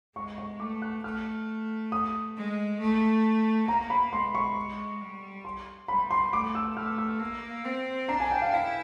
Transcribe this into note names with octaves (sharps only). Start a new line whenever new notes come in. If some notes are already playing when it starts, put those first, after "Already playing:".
G#3 C#6
C#6
A3 D6
F#6
A3 F6
D#6
G#3
A3
A#3 A#5
B5
G#3 C6
C#6
G3
C6
G3 B5
C6
A3 D6
E6
A3 F6
E6
A#3
C4
D4 A#5
G#5
G5
F5
E4 F5